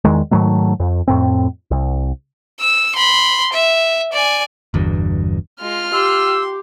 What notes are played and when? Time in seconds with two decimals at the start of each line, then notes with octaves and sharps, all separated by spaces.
0.04 E2 D#3 G#3
0.31 G#2 D#3 F#3 A3
0.80 F2
1.08 F2 A2 C4
1.71 C2
2.60 E6
2.96 B5 C6
3.53 E5
4.13 D5 G#5
4.74 G1 E2 G2 B2
5.61 G#3 F4 F6
5.93 G4 C6 E6